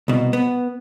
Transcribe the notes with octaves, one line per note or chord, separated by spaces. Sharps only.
C2 B2
B3